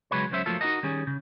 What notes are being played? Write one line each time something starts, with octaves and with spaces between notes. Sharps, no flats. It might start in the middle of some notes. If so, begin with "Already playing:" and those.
C#3 F#3 G#3 B4 C#5
C#2 F#3 C#4 C5 E5
F3 F#3 A3 A#3 F4 A4
D#4 F4 F#4 A#4 D#5
D#3 G3 C#4 G#4
C#3